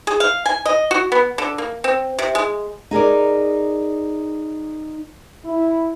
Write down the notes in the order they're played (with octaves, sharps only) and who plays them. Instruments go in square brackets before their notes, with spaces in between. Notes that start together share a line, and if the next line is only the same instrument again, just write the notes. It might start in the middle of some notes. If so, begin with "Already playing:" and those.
[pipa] G#4
F5
G#5
D#5
F#4
B3
D3
A#3
C4
C3
G#3
[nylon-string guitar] D#4 G#4 A#4 D5
[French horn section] E4